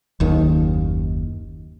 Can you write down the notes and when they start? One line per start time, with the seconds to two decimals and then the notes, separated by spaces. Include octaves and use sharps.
0.20 F#1 D#2 D#3